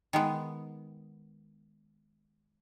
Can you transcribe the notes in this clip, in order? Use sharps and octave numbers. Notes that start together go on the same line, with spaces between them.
D#3 G#3 B3